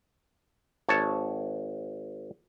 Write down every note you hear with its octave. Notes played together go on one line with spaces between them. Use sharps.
G#1 C#5 A5